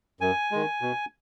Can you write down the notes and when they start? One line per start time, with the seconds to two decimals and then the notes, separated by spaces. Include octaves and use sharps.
0.21 F#2 G#5
0.52 D#3 G#3
0.81 B2